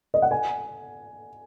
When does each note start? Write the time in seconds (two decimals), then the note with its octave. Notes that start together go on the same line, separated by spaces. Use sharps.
0.14 D#5
0.22 F#5
0.31 G#5